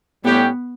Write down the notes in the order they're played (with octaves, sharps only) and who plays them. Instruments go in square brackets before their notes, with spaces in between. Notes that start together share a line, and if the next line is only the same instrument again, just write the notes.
[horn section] A2 G3 C#4 G4 [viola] B3